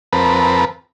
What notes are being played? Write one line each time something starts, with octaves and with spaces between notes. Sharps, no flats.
F2 C4 A#4 B4 A5 B5